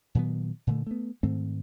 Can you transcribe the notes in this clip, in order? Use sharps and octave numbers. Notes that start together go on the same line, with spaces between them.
A#2 D#3 F#3 B3
A#2 D3 A3
A3 B3
G#2 D#3 A3 C4